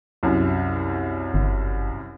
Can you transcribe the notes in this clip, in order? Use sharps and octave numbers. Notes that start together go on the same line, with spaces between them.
C2 F#2
G1